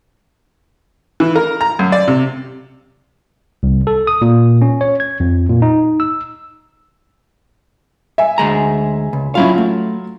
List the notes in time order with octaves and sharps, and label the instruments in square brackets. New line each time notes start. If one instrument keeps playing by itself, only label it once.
[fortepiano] E3
A#4
A#5
F#2
D5
C3
[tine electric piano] C2
A4
D#6
A#2
C#4
C#5
G#6
F2
A#2
D#4
E6
[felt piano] E5 G#5
[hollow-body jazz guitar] D2 G#3 A#5
C#2
[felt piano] F#3 F4 [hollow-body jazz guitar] C#4 E4 F5
[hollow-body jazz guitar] A3